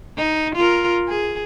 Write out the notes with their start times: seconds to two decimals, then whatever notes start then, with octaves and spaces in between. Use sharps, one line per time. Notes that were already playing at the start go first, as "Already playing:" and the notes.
0.17 D#4
0.56 F4 A#4
1.08 G#4